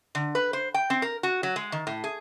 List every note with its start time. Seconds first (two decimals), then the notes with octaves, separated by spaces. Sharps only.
0.15 D3
0.35 B4
0.53 C5
0.74 G5
0.90 C4
1.02 A#4
1.23 F#4
1.43 F#3
1.56 G#3
1.72 D#3
1.87 A2
2.04 G#4